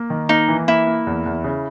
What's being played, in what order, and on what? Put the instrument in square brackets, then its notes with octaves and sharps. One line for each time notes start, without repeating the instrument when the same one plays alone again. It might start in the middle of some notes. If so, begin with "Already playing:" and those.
Already playing: [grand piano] A#3
D#3
[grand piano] A#3 [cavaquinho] D#4
[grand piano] E3
[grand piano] A#3 [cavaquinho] E4
[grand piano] A#3
E2
E2
C#3